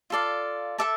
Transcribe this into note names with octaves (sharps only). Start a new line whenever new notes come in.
F4 A4 D5 F5
A4 E5 A5 D6